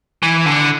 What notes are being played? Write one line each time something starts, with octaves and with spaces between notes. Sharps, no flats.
E3
D3